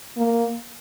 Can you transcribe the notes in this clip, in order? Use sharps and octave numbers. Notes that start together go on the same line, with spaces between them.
A#3